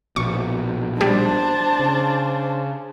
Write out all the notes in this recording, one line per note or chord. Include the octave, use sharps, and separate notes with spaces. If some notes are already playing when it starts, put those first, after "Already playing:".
A#1 B2 C#6
G3 D4 C5 A5
C#3